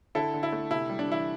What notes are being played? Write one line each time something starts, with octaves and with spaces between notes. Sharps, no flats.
D3 E4 A4
D3
E4
A3
C3 E4
G3
D4
E3 E4